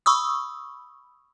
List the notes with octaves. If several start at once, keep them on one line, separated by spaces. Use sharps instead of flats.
B5 C#6 D#6 E6